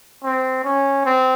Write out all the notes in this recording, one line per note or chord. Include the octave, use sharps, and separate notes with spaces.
C4
C#4
C4